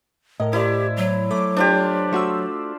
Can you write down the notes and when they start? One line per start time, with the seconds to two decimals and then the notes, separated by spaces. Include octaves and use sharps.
0.40 A2 A#4 D#5
0.53 E4 G4 C5 D5
0.97 F#3
1.31 A3 D6
1.57 D4 F4 G4 C5
2.13 A3 F#4 C6 E6